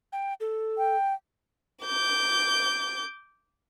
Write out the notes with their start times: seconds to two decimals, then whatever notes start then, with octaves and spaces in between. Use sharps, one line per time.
0.13 G5
0.40 A4
0.78 G5
1.85 D6 G6